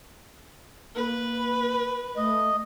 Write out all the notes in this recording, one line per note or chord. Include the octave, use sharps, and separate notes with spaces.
A#3 B4
A3 D#5